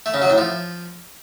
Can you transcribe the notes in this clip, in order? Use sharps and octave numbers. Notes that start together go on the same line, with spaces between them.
A3
C#3
F#3
A2
F3